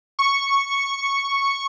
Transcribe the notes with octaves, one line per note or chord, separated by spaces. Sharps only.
C#6